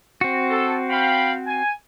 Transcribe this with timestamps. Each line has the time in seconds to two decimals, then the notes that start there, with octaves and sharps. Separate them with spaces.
0.21 C4 F#4
0.50 A4
0.90 F5 G5 B5
1.47 G#5